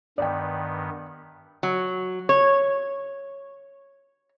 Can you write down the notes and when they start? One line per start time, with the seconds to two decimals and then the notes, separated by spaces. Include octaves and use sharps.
0.18 G2 D#3 B3 D5 G5
1.63 F#3
2.29 C#5